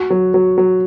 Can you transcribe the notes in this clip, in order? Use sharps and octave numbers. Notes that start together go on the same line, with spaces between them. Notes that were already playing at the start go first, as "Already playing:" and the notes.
Already playing: F#4
F#3
F#3
F#3